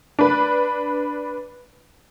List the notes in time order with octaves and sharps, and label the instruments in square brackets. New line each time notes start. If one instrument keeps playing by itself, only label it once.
[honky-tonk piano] D4 B4